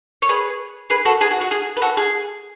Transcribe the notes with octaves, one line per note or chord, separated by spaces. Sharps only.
C#5
G#4 B4
G#4 B4
F#4 A4
G#4 B4
F#4
F#4
G#4
B4
F#4 A4
G#4